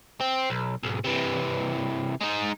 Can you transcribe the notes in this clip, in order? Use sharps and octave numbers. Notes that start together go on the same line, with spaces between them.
C4
B1
B1 G#2
C3 E3
G#3 D#4